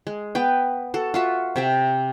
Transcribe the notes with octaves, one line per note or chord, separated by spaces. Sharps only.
G#3
B3 B4 G5
F#4 A4
F4 F#4 E5
C3 E5 G5